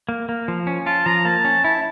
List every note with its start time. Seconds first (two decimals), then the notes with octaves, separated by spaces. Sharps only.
0.09 A#3
0.29 A#3
0.48 F3
0.67 C#4
0.86 F4 A5
1.06 F3 A#5
1.25 A#3 A5
1.45 C#4
1.64 E4 A5